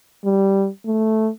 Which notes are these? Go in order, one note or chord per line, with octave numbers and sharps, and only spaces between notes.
G3
A3